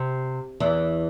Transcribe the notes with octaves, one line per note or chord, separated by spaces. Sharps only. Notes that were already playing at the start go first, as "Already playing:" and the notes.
Already playing: C3
E2 E3